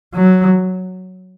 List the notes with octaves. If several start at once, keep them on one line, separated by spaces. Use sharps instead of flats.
F#3